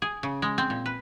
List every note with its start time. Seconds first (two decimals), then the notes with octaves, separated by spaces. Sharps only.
0.02 G#4
0.23 C#3
0.42 G#3
0.58 C4
0.70 A#2
0.86 B4